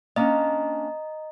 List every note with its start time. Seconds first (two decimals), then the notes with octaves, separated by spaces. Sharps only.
0.16 A#3 C#4 D4 D#5 A#5